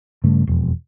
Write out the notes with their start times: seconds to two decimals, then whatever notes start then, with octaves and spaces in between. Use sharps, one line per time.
0.24 G2 C#3 A3
0.47 E1 F2